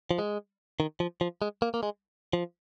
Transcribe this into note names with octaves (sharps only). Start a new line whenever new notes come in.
F3
G#3
D#3
F3
F3
G#3
A#3
A#3
G#3
F3